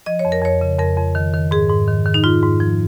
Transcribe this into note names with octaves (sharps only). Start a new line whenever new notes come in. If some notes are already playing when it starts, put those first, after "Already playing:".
F3 D#5
C#5
F2
A#4
F2 C#5
C#3
F2 A#4
F2
D#3
D#3
G#2 G#4
G#2
D#3
D#3
D#4
G#2 F4
G#2
F3